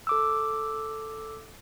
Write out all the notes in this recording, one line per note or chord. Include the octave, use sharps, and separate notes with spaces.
A4 D6 E6